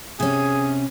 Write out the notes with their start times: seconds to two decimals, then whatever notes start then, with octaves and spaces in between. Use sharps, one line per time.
0.20 C3 C#4 G#4